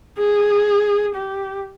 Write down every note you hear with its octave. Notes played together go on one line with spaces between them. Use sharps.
G#4
G4